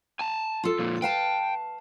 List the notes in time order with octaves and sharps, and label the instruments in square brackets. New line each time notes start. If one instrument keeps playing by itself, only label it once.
[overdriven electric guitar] G#5 A5
[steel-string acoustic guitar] F4 A4
[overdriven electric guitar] F2 A#2
[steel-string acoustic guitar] B4 F5 A5 [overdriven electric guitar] G5